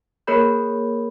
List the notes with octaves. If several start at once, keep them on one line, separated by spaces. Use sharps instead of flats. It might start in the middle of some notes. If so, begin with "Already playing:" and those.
A#3 G#4 A#4 C#5 B5 G6